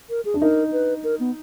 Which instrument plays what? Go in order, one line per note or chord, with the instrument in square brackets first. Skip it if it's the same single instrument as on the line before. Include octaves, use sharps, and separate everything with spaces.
[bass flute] A#4
G#4
[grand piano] D4
[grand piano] D#4 [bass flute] A#4
[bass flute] B4
A#4
B3